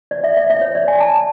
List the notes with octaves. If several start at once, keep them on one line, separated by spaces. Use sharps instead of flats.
D5
E5
E5
E5
C#5
D5
G#5
A5